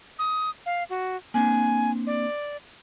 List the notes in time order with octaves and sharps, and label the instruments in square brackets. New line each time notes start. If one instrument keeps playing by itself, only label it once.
[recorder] D#6
F5
F#4
[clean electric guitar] A#3 C4 D4 [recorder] G#5
[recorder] D5